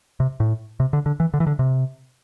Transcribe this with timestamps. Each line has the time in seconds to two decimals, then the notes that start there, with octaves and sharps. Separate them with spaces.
0.20 C3
0.40 A2
0.80 C3
0.93 D3
1.06 D3
1.20 E3
1.34 D3
1.40 E3
1.47 D3
1.59 C3